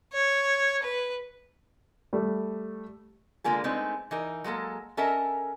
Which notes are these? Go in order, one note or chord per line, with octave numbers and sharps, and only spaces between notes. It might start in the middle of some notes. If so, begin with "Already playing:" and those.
C#5
B4
G3 A3
D3 G#3 A#3 F4 G#4
G#3 A3 B3 C4 D#4
E3 D#4 A#4
F#3 G#3 A#3 A4
C#4 A4 A#4 D#5 E5